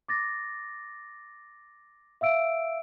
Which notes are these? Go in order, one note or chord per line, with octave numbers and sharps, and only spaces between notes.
D6 A6 A#6
E5 F5 E6 D7